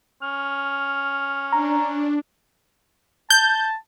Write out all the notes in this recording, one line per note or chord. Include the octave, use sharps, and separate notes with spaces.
C#4 F6
D4 A#5
A5 G6